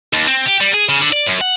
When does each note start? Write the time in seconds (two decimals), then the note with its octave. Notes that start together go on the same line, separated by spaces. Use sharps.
0.13 D#2
0.28 C4
0.46 G4
0.61 G3
0.74 G#4
0.89 C#3
1.00 D3
1.12 D5
1.26 F#2
1.41 F#5